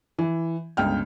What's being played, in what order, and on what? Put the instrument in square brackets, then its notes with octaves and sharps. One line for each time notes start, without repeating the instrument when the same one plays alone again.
[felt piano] E3
G1 C#2 G5 F6